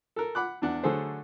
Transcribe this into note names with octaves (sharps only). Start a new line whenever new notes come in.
A4 A#4
F#5 B5 D6 F#6
E2 D4 F#5
D3 F#3 A3 G#4 A4 C5